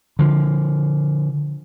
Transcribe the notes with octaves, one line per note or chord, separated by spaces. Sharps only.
D3 F3